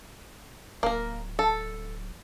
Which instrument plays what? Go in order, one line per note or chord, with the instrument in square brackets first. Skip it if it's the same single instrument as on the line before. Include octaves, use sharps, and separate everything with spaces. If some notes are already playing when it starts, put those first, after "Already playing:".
[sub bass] D1 [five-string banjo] A#3 A#4
[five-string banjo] A4